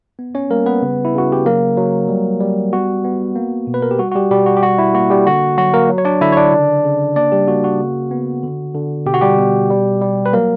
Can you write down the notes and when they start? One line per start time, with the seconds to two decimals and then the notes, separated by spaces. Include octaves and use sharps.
0.19 B3
0.35 C#4 C#5
0.50 G3 A#3 A#4
0.66 B3 B4
0.82 C#3
1.05 E4
1.14 C#3 F#4
1.32 G4
1.46 F#3 A#3 A#4
1.77 F#3
2.09 G3
2.41 G3
2.73 B3 F#4
3.05 B3
3.36 A#3
3.67 B2
3.74 B4
3.82 A#4
3.91 G4
3.99 G3 F#4
4.12 F#4
4.15 G3 G4
4.31 B2 G3 G4
4.46 F#4
4.57 G4
4.63 G3 F#4
4.78 E4
4.94 A#3 F#4
5.10 G3 G4
5.26 D3 F#4
5.58 F#3 F#4
5.74 A#3 A#4
5.90 F#3
5.98 C#5
6.05 D4 D5
6.21 D3 E4 E5
6.32 C#5
6.37 D4 D5
6.53 C#3
6.84 C#3
7.16 A#3 D4 D5
7.32 G3 G4
7.48 A#3 F#4
7.64 F#4
7.80 C#3
8.11 B3
8.43 D3
8.74 D3
9.06 B2 G4
9.14 F#4
9.21 G3 G4
9.38 B2
9.70 G3
10.01 G3
10.26 B4
10.33 F#3 A#3 A#4